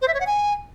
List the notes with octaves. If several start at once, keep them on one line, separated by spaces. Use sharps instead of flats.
C5
E5
C#5
F#5
G#5